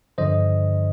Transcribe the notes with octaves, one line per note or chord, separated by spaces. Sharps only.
G2 D3 F3 C5 D#5